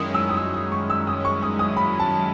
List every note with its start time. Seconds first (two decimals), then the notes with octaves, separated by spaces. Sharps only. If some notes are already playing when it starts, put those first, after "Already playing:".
Already playing: F#2 D#3 G#3 C#4 E4 D#6
0.14 E6
0.29 D#6
0.37 E6
0.54 D#6
0.72 C#6
0.90 E6
1.07 D#6
1.25 C#6
1.43 D#6
1.59 D#6
1.77 B5
2.00 A5